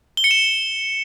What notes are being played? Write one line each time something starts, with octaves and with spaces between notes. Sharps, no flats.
G7
C#7
E7